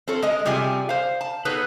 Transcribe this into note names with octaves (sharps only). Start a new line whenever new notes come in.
C4 F4 A4 C#5
G#3 D#5
C3 G3 F4 G#4 G#5
C5 F5
A5
B3 D#4 G#4 A4 B4 C#5